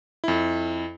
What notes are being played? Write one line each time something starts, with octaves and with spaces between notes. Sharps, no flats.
F2 E4